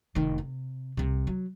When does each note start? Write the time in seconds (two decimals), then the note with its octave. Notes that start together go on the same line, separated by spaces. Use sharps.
0.15 F1 D#3
0.38 C3
0.97 C2 C3
1.27 F#3